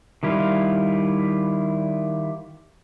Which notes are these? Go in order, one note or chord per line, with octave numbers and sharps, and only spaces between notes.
D#3 G3 E4 F4 F5